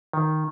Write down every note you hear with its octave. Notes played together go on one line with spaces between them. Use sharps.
D#3